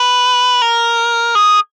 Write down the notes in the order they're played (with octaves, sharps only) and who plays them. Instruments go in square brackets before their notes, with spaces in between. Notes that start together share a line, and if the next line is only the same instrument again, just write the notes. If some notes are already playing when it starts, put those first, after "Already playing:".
Already playing: [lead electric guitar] B4
A#4
G#4